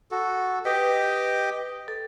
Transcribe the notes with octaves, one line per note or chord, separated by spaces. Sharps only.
F#4 A4
G4 B4 D#5 G5
A4